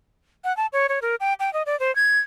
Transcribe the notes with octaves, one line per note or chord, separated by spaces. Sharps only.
F#5
A5
C#5
C#5
A#4
G5
G5
D#5
D5
C5
G#6